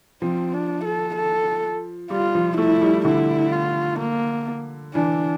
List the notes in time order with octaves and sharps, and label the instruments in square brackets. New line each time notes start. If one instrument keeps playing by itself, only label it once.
[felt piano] F3 [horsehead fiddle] C4
[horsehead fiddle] D4
A4
A4
[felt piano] G3 [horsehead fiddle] F4
[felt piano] F3
[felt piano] A3 [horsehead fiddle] E4
[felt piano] G3
[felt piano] D3 [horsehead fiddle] E4
[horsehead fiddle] F4
A#3
[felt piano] E3 [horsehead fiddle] D4